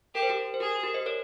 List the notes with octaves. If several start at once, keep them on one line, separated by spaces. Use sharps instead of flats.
G4 A#4
C5
G4 A#4
C5
G4 G#4 A#4
G4 A#4
C5 D#5
A#4 C#5